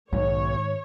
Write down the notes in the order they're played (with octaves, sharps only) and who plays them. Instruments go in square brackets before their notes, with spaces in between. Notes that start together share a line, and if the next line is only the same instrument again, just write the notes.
[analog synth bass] B1 [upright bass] G#2 D#3 [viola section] C#5